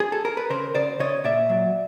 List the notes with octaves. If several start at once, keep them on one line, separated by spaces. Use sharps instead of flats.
G#4
A4
A#4
B4
C#3 A#4 C5
C#3 C5 D5
C#3 C#5 D#5
A#2 D5 E5
F#3